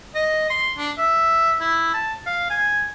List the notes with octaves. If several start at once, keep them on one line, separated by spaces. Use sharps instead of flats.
D#5
C6
D4
E5
E4
A5
F5
G#5